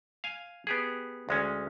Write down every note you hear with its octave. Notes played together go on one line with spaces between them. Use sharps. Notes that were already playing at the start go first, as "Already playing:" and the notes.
F5 G#5
B3 G4 G#4
D2 G#3 C#4